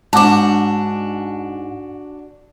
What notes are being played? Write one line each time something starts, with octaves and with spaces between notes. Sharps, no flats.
G#2 D4 F#4 A5 D6